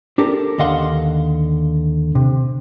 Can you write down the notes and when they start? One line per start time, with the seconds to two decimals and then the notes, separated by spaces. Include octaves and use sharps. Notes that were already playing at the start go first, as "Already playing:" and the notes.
0.18 D4 G4 A4 A#4
0.58 D#2 D3 D#5 F5 F#5 C6
2.15 C3